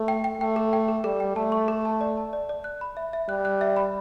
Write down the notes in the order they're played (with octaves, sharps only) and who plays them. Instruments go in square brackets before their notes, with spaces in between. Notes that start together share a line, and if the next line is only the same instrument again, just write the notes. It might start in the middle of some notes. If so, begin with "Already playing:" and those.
Already playing: [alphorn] A3
[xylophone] G5
G5
[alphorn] A3 [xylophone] G5
[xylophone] A4
G5
A4
[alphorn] G3 [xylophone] A4
[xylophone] G5
[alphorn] A3 [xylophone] A5
[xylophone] C#6
A4
A5
D5
A5
D5
D5
F#6
B5
E5
E5
[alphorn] G3 [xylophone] F#6
[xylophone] F#6
E5
B5